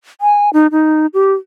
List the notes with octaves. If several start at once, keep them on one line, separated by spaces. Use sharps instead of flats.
G#5
D#4
D#4
G4